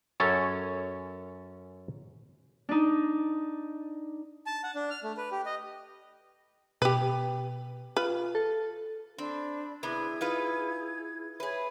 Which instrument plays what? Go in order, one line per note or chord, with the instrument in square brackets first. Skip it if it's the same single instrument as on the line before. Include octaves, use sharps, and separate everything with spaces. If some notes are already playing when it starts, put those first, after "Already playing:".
[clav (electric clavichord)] F#2 C#4 A4 C#5 A5
[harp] D4 D#4
[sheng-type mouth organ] A5
F#5
D4
F6
A3
B4
G4
D#5
[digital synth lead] B2 [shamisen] G4 B4
[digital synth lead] F4 [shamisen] B4
[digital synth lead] A4
[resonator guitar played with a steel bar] C4 [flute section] D4 B5
[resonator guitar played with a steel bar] C3 B3 D4 [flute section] E4 G#4 G#6
[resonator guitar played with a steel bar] D#4 F4 B4
[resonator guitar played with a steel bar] G#4 B4 [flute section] C#5 E5